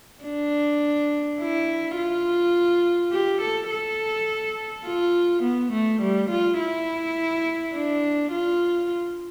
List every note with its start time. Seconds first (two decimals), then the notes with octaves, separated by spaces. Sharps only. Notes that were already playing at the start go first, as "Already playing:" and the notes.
0.24 D4
1.40 E4
1.97 F4
3.12 G4
3.42 A4
3.70 A4
4.86 F4
5.43 B3
5.72 A3
6.01 G3
6.30 F4
6.59 E4
7.74 D4
8.32 F4